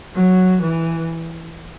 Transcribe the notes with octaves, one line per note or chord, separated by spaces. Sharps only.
F#3
E3